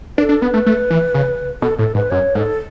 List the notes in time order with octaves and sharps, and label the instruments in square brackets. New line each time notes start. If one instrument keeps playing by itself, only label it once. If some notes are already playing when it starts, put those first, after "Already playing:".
[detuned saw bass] D4 [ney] B4
[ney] A4
[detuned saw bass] D4
[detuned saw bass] B3 [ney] B4
[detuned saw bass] A3
A3
E3
C#3
[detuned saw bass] B2 [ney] A4
[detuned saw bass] A2 [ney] A4
[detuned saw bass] G#2 [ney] B4
[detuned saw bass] F#2 [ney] C#5
[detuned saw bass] G#2 [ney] A4